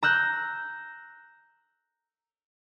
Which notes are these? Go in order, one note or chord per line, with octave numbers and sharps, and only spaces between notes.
A#5 E6 F#6 G6